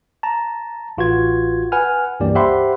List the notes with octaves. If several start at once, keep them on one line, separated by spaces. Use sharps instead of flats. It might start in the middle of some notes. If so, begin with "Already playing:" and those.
A5 A#5
A1 F4 F#4 B4 G#6
B4 F#5 G#5 F6
C#2 G2 E3 A#3 G4 D5
G4 C5 E5 F#5 B5 C6